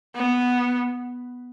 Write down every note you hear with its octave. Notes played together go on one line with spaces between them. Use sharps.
B3